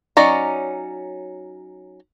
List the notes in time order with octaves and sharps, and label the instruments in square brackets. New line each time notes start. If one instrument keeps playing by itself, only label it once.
[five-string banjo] F#3 C#4 D#4 D5 A#5